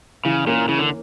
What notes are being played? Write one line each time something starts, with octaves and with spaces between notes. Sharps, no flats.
C#3 E3
A#2 A#3 C#4
C#3 E3
D3